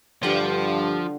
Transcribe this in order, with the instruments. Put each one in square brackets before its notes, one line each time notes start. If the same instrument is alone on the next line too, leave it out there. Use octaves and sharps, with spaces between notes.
[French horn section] G2 [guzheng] D3 G3 F4 [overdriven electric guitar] F3 [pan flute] G4